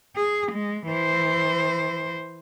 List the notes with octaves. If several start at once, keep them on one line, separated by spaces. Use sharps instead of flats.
G#4
G#3
E3 C5